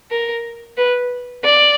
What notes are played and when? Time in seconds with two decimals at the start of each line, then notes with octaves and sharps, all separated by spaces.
0.11 A#4
0.78 B4
1.44 D5